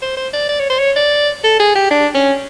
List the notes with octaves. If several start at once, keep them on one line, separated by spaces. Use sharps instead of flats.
C5
C5
D5
D5
C#5
C5
C#5
D5
A4
G#4
G4
D4
C#4